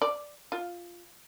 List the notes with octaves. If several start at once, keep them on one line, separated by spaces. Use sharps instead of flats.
D5
F4